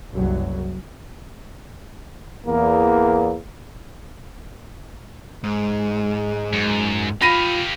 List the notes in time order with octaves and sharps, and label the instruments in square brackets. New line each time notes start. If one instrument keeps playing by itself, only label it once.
[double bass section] F#1 C2 F#3
[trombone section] E2 A#3
[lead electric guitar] G#2 [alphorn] G#3
[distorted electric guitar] F#2
[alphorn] F4 [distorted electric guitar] G4 F5 [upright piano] B5 A#6 D#7